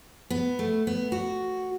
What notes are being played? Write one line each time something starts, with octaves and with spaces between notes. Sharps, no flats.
B3
A3
B3
F#4